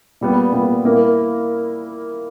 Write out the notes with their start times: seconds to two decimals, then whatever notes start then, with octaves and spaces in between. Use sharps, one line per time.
0.21 A#2 G3 B3
0.53 A#2 G3 B3
0.84 A#3 E4 A#4